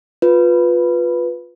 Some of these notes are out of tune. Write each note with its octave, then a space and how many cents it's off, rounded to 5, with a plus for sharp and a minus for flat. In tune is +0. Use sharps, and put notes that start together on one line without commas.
F4 +20 B4 +0